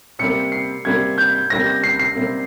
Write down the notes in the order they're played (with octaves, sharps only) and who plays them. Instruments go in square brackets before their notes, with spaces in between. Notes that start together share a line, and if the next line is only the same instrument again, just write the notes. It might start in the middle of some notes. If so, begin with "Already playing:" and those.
[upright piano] C3 G3 A#3 [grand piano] C#7
[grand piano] C7
[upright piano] C3 G3 A#3 [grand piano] G#6
[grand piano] G6
[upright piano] C3 G3 A#3 [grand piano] A#6
[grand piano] A#6
C7
C7
[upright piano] C3 G3 A#3